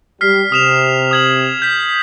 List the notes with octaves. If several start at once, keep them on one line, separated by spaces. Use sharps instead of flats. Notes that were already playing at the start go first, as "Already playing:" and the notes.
G3 G4 F6 B6 C7
C3 D#6 E7 F7
D#6 G#6 F#7
G6 B6